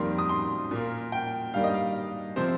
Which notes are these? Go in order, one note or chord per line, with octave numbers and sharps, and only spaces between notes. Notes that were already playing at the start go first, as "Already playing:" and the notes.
Already playing: F2 D#3 G3 A#3 C6
D#6
C6
A#2 A#3
G5
G2 D#3 G3 A#3 F5
D#5
F5
C3 F3 C4 C5